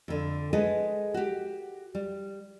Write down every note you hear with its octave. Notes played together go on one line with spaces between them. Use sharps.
F2 D3
G#3 G#4 A4 B4 D#5
F#4 G4
G3